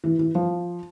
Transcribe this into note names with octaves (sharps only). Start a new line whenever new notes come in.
E3
E3
F3